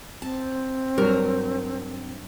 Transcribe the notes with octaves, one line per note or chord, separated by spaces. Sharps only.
C4 A5
G2 F#3 A#4